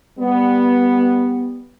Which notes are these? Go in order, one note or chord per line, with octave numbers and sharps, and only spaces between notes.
G3 B3